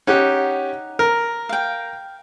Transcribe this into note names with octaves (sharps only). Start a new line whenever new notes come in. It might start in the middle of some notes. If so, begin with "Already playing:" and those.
C#4 D#4 G4 F#5
A#4
F5 G5